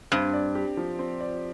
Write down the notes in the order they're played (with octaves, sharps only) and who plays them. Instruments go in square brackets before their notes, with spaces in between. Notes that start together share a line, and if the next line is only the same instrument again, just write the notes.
[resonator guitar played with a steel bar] G2 [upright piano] C4
[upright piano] D5
G4
F3
C4
D5